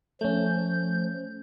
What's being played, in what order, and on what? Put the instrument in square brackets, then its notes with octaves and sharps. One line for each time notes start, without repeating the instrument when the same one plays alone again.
[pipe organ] F3 G6 [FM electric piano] A3 C#4